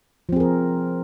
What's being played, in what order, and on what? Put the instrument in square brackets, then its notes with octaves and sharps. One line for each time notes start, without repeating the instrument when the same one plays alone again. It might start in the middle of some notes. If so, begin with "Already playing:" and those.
[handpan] F3
C4
G#4
A#4